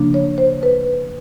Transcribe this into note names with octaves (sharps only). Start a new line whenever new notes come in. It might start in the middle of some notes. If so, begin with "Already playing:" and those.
Already playing: C#3 F3 A#3 D4
C#5
C5
B4